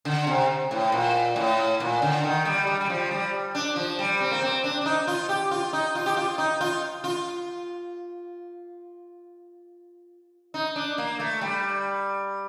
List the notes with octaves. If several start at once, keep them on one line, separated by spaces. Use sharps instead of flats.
D3
C3
A2
A#2
A2
A#2
D3
D#3
G3
G3
G3
F3
G3
D4
F3
G3
C4
A#3
C4
D4
D4
D#4
F4
G4
F4
D#4
F4
G4
F4
D#4
F4
F4
D#4
D4
A#3
A3
G3